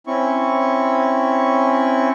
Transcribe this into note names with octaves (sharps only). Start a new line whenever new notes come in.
C4 C#4 E4 C#6